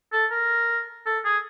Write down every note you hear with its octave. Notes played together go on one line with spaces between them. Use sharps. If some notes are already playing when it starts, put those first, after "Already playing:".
A4
A#4
A4
G#4